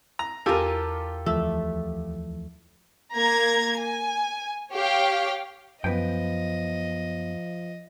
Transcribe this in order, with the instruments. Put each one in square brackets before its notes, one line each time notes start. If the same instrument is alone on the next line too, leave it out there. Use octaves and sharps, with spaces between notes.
[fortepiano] A#5
[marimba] E2 [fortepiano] F4 G4 A4 [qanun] A#4 G#5
[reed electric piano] D2 E3 F3 [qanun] A3 [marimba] E6
[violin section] A#3 A#5 G#6
G#5
G4 C#5 F5 G5
[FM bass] F#2 [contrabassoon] F3 [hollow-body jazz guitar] B3 B4 G5 [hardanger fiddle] D#5